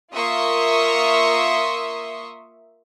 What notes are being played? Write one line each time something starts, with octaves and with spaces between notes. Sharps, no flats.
A#3 F4 E5 C6 C#6 D#6